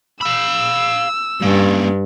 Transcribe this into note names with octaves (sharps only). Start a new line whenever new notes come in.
F5 B5 E6
G2 A#3 C#4